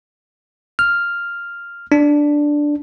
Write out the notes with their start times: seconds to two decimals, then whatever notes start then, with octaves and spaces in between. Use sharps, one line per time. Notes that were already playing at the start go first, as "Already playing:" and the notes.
0.79 F6
1.92 D4